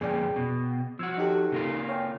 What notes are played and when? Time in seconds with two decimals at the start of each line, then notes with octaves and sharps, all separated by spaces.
0.01 F2 A#2 C#4 G#4 D5 G5
0.36 B2
0.99 F3 F#4 E6 G#6
1.18 D#4 G4 A4
1.52 C#3 A#3 F4
1.89 C#5 G5 G#5